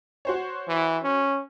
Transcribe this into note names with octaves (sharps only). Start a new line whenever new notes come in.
F#4 C5 C#5
E3
C#4